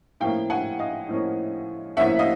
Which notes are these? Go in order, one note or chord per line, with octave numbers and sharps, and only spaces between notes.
A2 F3 A#3 C#4 F5 G5
F#5 G#5
D#5 F5
A2 F3 A#3 C#4
A2 F3 A#3 C#4 E5 F#5
D#5 F5